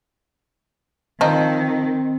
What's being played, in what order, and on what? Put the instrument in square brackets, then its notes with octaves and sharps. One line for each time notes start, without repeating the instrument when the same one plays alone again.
[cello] D#3 [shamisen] F3 D#4 [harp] C4